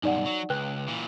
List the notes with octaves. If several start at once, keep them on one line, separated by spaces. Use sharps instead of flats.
B1 G2 D#4 D5 F#5
F#3
C#2 B4 G5 F#6
A#2 E3